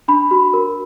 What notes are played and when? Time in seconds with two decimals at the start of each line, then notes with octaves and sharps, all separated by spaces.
0.08 D4 B5
0.31 F#4
0.54 A#4